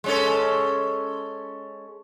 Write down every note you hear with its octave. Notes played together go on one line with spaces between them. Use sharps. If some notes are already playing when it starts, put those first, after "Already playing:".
G#3 C#4 A4